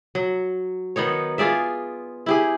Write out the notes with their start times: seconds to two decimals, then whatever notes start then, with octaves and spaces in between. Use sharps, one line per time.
0.15 F#3
0.96 D#3 B3 D#4 C#5
1.38 F4 G#4 D5 E5
2.26 E4 G4 G#4